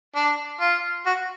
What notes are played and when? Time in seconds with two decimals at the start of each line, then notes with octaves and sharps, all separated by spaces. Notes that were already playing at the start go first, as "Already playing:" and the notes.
0.16 D4
0.61 F4
1.06 F#4